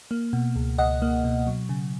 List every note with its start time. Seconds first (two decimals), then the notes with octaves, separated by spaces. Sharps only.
0.11 A#3
0.33 B2
0.56 C#2
0.78 C#2 D#5 F#5
1.02 A#3
1.24 B2
1.47 F#3
1.69 C#3